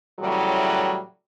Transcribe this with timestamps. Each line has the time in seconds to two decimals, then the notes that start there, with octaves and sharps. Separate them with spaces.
0.20 A2 C#3 E3 F#3 G3